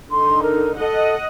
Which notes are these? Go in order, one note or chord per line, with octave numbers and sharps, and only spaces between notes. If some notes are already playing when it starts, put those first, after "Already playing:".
D3 D#4 C6
A#4
A4 D#5 F#5